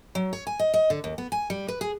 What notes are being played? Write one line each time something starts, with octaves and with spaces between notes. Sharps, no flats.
F#3
C#5
G#5
D#5
D#5
D3
D#2
B3
G#5
G3
B4
G#4